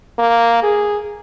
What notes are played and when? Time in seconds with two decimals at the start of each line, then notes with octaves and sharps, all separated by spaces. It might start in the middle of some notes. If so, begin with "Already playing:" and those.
0.19 A#3
0.63 G#4